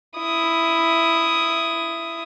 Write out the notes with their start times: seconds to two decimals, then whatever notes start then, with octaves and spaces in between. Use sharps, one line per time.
0.17 E4 D#6